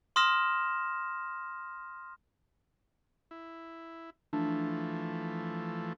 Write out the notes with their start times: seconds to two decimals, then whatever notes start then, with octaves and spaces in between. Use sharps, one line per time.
0.16 C6 D#6 F6 A#6 E7
3.31 E4
4.33 E3 F3 A3 D4